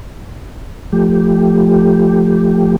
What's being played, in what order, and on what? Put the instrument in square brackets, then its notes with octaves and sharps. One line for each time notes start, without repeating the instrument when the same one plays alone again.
[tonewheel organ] F3 A3 G4